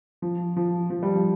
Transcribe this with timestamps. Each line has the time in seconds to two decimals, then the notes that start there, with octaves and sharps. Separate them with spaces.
0.22 F3
0.56 F3
0.90 F3
1.03 G3
1.15 F3